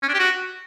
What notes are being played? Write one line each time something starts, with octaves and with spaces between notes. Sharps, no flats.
C#4
D4
G4
F#4